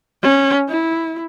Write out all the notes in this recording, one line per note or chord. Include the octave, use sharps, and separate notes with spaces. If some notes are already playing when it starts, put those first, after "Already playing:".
C#4
E4